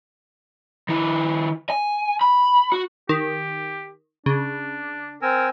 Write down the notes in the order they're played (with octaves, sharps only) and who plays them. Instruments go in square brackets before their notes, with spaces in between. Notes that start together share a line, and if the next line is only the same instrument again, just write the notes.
[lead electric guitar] D#3 E4
G#5
B5
F#4
[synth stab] D#3 [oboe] G4
[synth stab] C#3 [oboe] D4
[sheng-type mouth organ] C4 G#5 E6 [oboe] A#4